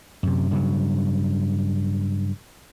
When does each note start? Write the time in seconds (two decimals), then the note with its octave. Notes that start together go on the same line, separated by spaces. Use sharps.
0.23 F#2 C3
0.51 G2 C#3 F#3